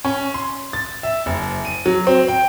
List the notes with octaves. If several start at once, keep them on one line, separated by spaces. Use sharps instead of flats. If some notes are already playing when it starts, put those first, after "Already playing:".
C#4
C6
A6
E5
F#1
D#7
F#3
C4
G5